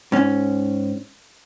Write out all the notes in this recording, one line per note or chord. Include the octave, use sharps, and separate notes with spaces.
G#2 C#4